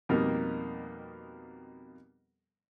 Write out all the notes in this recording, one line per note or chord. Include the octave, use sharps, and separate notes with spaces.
F2 B2 G3 A#3 D#4